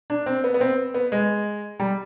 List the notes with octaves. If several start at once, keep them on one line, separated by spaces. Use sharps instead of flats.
D4
C4
B3
B3
C4
B3
G#3
G3